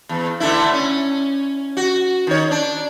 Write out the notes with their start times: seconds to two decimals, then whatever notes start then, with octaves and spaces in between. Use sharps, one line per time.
0.09 E2
0.40 D3 A3 E4
0.72 C#4
1.77 F#4
2.27 D#3 C#5
2.51 D4